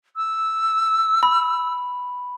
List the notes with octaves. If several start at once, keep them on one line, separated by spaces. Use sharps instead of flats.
E6
B5